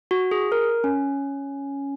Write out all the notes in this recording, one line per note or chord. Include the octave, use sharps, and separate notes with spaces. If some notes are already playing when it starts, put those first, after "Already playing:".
F#4
G#4
A#4
C#4